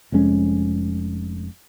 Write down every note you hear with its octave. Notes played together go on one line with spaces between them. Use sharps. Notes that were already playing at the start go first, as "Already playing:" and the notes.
F1 F2 G#3 C#4